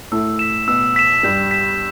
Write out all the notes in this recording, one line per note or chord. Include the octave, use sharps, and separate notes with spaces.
A2 A3 E6
B6 E7
B2 B3 E6
B6 E7
G2 G3 G6
B6 E7